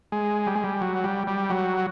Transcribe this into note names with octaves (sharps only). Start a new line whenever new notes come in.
G#3
G3
G#3
G3
F#3
G3
G3
F#3